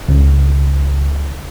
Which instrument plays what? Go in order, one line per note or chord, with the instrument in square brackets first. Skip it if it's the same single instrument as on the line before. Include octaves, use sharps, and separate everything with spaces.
[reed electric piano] C#2